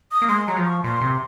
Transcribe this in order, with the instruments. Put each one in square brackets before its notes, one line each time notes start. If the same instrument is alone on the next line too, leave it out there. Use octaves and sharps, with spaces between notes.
[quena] D#6
[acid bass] A#3
[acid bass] G#3 [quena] C6
[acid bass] F#3 [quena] A#5
[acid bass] F3
[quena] C#6
[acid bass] A#2 [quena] C6
[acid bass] C3